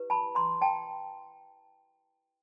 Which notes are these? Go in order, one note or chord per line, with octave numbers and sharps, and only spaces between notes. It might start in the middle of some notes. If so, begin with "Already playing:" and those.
Already playing: E4 G4 B4
A5 B5
A#5 C6
G5 A5